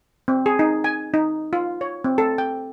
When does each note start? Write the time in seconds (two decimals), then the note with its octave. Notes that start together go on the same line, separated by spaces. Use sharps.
0.28 C4
0.46 G#4
0.59 D#4
0.84 G#5
1.14 D#4
1.53 F4
1.81 C#5
2.04 C4
2.18 A4
2.38 G5